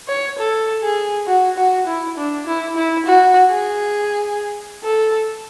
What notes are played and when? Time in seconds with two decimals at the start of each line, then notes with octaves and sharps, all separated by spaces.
0.09 C#5
0.39 A4
0.83 G#4
1.27 F#4
1.58 F#4
1.87 E4
2.18 D4
2.47 E4
2.76 E4
3.06 F#4
3.50 G#4
4.84 A4